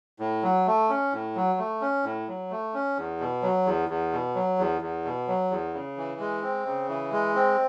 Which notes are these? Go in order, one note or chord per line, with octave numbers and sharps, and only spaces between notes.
A2
F#3
A3
C#4
A2
F#3
A3
C#4
A2
F#3
A3
C#4
E2
B2
F#3
E2
E2
B2
F#3
E2
E2
B2
F#3
E2
C#3
E3
G#3
C4
C#3
E3
G#3
C4